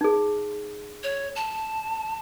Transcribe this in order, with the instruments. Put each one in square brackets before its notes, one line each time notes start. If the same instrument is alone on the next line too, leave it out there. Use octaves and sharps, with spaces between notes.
[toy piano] D#4 G#4
[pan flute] C#5
A5